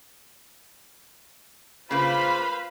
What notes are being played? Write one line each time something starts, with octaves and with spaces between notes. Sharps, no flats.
C#3 A#3 F4 B4 C5 F5 B5